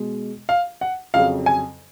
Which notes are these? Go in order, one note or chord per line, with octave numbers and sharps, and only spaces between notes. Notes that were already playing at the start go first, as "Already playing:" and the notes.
Already playing: B2 G#3
F5
F#5
F2 C#3 F#3 F5
G#5